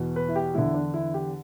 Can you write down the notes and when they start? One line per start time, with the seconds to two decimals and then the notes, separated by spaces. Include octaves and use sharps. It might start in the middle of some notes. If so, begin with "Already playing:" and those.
Already playing: E2 B2
0.16 B4
0.29 E4
0.36 G4
0.54 E2 D3 E4
0.74 D4
0.94 E4
1.14 G4